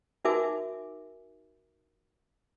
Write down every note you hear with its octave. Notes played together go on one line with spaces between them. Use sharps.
D#4 F#4 A#4 E5 G#5 D6